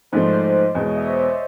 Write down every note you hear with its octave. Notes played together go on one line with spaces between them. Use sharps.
G#2 F3 A3 C5 D5
E2 B2 G#3 C#5 D#5
C#5 D#5
D5 E5
C5 D5